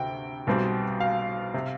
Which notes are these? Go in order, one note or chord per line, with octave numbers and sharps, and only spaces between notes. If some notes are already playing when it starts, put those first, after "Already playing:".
Already playing: D2 C3 G5
B1 B2 G3 C4
F5
C3